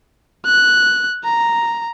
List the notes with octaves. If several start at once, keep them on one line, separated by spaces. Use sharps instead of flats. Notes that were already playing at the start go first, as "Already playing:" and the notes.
F#6
A#5